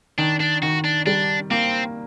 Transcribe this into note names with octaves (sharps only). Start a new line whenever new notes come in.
D#3 D4
D4
D#3 F#4
D4
G3 D4
A#3 C4